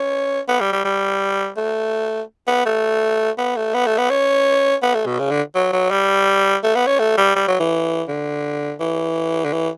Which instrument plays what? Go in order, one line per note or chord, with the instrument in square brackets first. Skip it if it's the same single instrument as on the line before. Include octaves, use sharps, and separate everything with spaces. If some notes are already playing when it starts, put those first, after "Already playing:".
Already playing: [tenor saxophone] C#4
B3
G3
G3
G3
A3
B3
A3
B3
A3
B3
A3
B3
C#4
B3
A3
B2
C#3
D3
F#3
F#3
G3
A3
B3
C#4
A3
G3
G3
F#3
E3
D3
E3
D3
E3